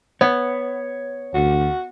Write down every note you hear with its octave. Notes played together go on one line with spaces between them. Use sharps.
B3 C#5
D2 F#4